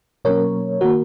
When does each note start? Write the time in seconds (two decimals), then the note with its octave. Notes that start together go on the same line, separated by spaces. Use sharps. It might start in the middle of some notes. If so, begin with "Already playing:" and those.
0.25 B2 F#3 A#3 C#4 A#4 C#5
0.81 D#3 A#3 F#4 A#4